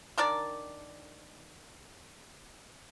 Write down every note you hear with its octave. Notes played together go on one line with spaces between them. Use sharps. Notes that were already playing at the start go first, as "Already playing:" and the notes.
D#3 D4 A#4 D5